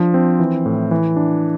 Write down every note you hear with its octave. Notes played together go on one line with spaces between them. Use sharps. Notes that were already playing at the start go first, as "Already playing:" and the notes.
Already playing: F3 D4
C4
E3
A2
E3
D4